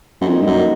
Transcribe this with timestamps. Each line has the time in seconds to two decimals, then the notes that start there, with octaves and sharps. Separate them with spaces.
0.21 F#2
0.27 F2 D3 G3 A#3 D#4
0.41 G2
0.46 F#2